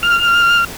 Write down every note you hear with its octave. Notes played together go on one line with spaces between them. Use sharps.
F6